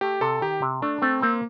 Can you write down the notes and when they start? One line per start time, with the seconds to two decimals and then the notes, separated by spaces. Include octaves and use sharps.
0.01 A3 G4
0.21 C3 A4
0.41 D#3 G4
0.62 C3
0.82 A3 D4
1.02 A3 C4
1.22 A#3 C4